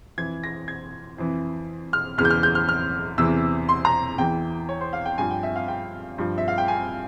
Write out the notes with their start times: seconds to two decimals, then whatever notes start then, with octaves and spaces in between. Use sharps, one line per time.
0.18 F2 E3 G#6
0.43 A#6
0.68 G#6
1.18 F2 E3
1.93 F6
2.18 E2 C#3 E3 F6
2.25 G6
2.30 F6
2.43 G6
2.55 F6
2.69 F6
3.18 E2 C3 E3 E6
3.69 C6
3.85 A#5
4.18 E2 E3 G5
4.69 C#5
4.81 C5
4.93 F5
5.06 G5
5.18 G2 F3 G#5
5.31 G5
5.43 E5
5.56 F5
5.68 G5
6.18 G2 F3
6.38 E5
6.48 F5
6.58 G5
6.68 G#5